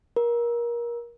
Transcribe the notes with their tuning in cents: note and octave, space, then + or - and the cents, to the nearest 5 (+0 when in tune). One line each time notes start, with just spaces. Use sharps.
A#4 +25